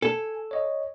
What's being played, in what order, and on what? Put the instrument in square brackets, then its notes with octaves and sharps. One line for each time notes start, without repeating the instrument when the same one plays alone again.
[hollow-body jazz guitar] A4 [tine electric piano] G#5
[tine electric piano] C#5 D#5